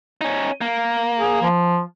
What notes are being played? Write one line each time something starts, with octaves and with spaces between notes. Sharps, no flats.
C#4 D#4
A#3
G#4
F3